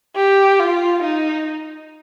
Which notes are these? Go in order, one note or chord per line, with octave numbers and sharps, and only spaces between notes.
G4
F4
D#4